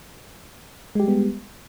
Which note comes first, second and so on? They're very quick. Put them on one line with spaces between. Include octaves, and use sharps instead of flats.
G#3 G4 G3 B3